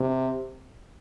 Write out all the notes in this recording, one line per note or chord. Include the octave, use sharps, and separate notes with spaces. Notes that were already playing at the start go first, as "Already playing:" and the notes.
Already playing: C3